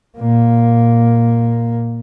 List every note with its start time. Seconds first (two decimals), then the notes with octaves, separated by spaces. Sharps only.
0.18 A#2 A#3